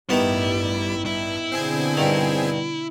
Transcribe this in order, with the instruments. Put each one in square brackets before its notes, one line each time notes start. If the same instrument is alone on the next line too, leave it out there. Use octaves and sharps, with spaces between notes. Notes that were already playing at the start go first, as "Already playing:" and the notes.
[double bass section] A1 G2 [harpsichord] D#3 B3 [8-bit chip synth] G3 [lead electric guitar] E4
[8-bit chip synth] G2 [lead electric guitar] E4
[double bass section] B2 D3 [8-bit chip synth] C4 G#4 G#5
[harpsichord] G2 D#3